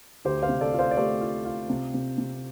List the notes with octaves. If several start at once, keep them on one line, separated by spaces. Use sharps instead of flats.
D2 G4 C5
C5 F5
C3
A4 D5
F4
C5 F5
D5
A3 G4 C5
F4
F4
C3
C3
C3